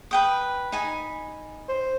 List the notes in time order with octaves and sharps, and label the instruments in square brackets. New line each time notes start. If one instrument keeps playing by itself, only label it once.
[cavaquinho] B4 G5 D#6
D#4 G#5 B5
[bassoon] C5